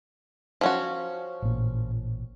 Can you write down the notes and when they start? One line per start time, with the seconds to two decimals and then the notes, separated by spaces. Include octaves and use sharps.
0.61 F3 C#4 F#4
1.42 A1 A#2